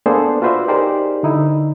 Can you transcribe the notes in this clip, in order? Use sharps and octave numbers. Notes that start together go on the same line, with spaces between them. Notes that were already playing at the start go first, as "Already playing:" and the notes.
A#3 B3 D4 G#4 A4 C5
F4 F#4 B4 C5 D5 E5
D#4 G4 G#4 A#4 C5 D5
D3 D#4 E4